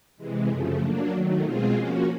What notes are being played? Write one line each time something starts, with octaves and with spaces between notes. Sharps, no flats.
C3 E3 G#3
F#2 C#3 F3 A3
F#3 A#3 D4
D#3 F#3 A3
B2 G#3 C4 F4 G#4
F3 A#3 C#4 F#4